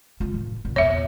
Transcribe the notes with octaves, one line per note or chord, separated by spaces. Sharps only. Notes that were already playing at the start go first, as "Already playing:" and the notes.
G#3 F4
A2 D#3
F#2 A#2
E2 A#2 C#5 E5